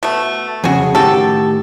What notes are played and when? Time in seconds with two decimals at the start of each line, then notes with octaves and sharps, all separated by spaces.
0.03 B2 A3
0.64 F2 C#3 F#4 G#4
0.95 A2 D#3 F#4 G4 A4